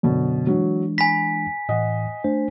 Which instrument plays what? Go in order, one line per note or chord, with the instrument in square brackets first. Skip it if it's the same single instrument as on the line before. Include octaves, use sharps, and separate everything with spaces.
[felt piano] F#2 B2 D3
[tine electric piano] E3 G#3 D4 [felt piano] F#3 F#4
[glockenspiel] G#5 B6 [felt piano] B5
[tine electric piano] A2 E3 [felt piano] D#5 F#5
[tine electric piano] A3 D4 C5